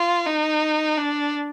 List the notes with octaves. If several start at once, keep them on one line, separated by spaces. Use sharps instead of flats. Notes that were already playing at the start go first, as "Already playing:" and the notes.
Already playing: F4
D#4
D4